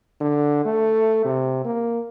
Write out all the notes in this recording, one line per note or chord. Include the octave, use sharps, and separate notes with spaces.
D3
A3
C3
A#3